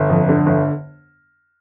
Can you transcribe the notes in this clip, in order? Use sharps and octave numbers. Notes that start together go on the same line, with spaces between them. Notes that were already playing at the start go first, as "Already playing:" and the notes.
Already playing: G1
F2
D3
G1